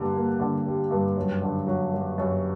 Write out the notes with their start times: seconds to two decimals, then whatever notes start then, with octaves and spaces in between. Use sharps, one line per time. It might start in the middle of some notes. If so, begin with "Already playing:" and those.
Already playing: G2 D3 G3 A#3
0.15 A#3
0.40 D3
0.66 G3
0.91 G2
1.16 F#2
1.42 D3
1.67 F#3
1.93 F#2
2.18 F#2